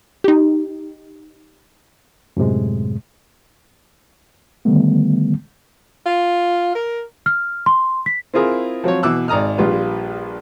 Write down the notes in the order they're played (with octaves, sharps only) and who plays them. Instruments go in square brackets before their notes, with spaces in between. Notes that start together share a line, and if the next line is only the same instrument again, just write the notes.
[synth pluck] D#4 G4
[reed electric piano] F#2 A2 C3 G#3
D3 D#3 G3 A3 B3
[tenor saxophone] F4
A#4
[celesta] F6
C6
B6
[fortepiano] C4 E4 F4 G#4 A#4
F3 F#3 C4 C#5
B2 E3 D6 E6 F#6
G#1 D5 A#5 D#6 F6
A#1 G3 F4 B4